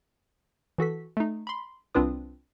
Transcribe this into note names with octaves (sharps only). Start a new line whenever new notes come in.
E3 F#4 A4 B6
A3 D#4
B5 C6
C2 C4 D4 F4 B4 D#6